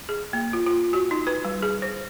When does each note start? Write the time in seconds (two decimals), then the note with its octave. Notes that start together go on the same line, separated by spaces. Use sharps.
0.09 G#4
0.33 A#3
0.53 F4
0.66 F4
0.93 F#4
1.11 D#4
1.27 B4
1.45 G3
1.62 G#4
1.82 C5